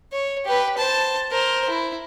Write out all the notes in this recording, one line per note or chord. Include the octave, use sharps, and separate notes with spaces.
C#5
G4 B4
C5 A5
A#4 C5
E4